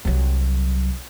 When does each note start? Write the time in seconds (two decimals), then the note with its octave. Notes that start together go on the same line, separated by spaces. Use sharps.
0.05 C2 F#3